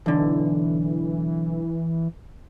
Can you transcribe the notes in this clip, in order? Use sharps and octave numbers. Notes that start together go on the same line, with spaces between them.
B1 D3 E3